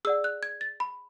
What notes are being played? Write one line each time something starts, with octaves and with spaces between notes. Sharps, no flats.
G#4 D5 F#5 E6
F#6
G#6
A6
B5